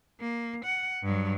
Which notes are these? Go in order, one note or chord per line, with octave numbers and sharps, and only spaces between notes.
A#3
F#5
G2 F#3